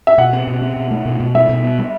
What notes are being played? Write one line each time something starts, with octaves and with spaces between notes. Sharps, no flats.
E5
B2 F#5
C4
B2
C4
B2
A3
B2
B2
G3 E5
B2
B3
G3